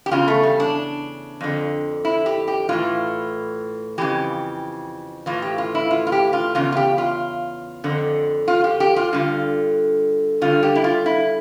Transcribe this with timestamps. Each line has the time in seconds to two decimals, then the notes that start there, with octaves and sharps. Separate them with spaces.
0.06 G4
0.11 E2 C#3 F4
0.28 A3
0.43 G3
0.60 D4
1.41 F2 D3
2.05 E4
2.26 G4
2.48 G4
2.69 A2 E3 F4
3.98 F2 C#3 E3 G4
5.26 A2 E3 F4
5.42 G4
5.58 F4
5.75 E4
5.91 F4
6.07 F4
6.12 G4
6.33 F4
6.55 E2 C#3 F4
6.72 F4
6.77 G4
6.98 F4
7.84 F2 D3
8.48 F4
8.64 G4
8.80 G4
8.96 F4
9.13 G2 D3 F4
10.42 G2 D3 F4
10.63 G4
10.75 E4
10.84 F4
11.06 E4